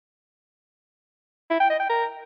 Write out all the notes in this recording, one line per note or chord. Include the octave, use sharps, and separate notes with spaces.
E4
G5
D#5
G5
A#4